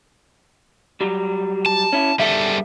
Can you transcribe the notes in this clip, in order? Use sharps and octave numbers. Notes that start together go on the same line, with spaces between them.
F#3 G3
A5
C#4 E4
C#2 G#2 G3 A4 E5